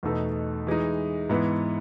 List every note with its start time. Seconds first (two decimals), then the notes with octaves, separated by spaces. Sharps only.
0.03 E2 B2 A3 D#4 A4
0.67 E3 G#3 D#4
1.29 G#2 E3 B3 E4